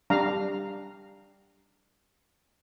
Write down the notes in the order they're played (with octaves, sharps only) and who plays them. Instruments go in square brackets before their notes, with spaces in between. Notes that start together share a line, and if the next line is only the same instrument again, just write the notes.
[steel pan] G3 D4 F5 A#5